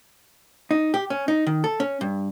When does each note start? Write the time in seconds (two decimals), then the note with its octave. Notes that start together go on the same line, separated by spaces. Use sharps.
0.71 D#4
0.94 G4
1.10 C#4
1.28 D#4
1.47 D#3
1.64 A4
1.80 C#4
2.01 G2